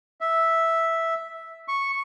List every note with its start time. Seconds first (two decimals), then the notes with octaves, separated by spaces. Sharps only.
0.21 E5
1.68 C#6